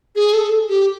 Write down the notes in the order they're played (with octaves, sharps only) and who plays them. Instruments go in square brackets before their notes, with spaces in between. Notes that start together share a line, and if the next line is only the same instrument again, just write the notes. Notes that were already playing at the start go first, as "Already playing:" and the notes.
[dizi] G#4
A4
G4